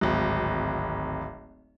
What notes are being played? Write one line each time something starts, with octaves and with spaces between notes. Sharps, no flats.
D1 G#1